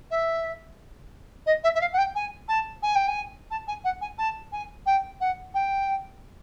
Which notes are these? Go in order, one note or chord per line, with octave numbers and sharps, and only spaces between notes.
E5
D#5
E5
E5
F5
F#5
G5
G#5
A5
G#5
G5
G#5
A5
G#5
F#5
G#5
A5
G#5
G5
F#5
G5